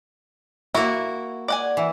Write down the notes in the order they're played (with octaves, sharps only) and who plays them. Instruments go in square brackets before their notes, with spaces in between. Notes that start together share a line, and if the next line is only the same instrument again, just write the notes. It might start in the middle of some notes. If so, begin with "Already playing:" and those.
[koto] A#3 F#4 [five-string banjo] E4
[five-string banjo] D5 F#5 G#5
[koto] E3